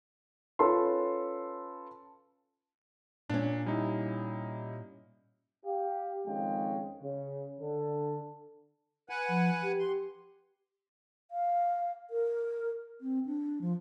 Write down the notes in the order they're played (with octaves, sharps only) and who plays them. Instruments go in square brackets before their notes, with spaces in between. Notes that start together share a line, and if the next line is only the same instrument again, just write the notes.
[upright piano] C#4 F4 A4 B4 C6
[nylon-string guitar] A#2 C#4 [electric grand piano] D4
[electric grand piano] G3 D#4 E4
[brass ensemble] G4 F5
F2 D#3 G#3 C#4 F5 G5
C#3
D3 A4
[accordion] B4 F#5 G#5
[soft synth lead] F3
G4
[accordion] C6
[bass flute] F5
A#4
C4
D4
F3